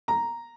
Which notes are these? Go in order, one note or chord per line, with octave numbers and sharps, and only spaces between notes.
A#5